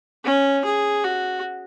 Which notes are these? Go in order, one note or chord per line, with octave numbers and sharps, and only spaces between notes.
C#4
G#4
F#4